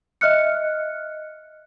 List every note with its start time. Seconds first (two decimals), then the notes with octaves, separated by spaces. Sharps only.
0.21 D#5 E5 F6 F#6 C#7